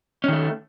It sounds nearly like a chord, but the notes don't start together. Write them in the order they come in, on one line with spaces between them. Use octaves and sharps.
C#4 D#3 A3